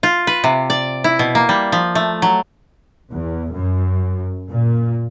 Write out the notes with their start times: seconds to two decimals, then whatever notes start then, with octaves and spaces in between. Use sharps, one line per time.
0.03 F4
0.27 B4
0.44 C3
0.70 D5
1.04 E4
1.19 B2
1.35 A#3
1.49 G3
1.72 F3
1.95 A3
2.22 F#3
3.12 E2
3.54 F#2
4.50 A#2